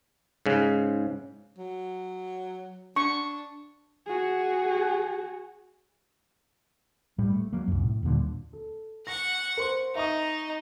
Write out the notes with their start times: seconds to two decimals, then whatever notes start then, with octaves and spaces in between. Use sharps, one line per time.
0.46 G#2 C#3
1.59 F#3
2.96 D4 C#6
4.06 F#4 G#4
7.18 A2 G3
7.30 A3
7.53 F#3 A#3
7.68 C2 F#2
7.82 A2
8.03 D#2 A#2 D3 G3
8.53 A4
9.07 F#5 C#6 A#6
9.57 A#4 C5 C6
9.95 D#4 E5 C#6 D#6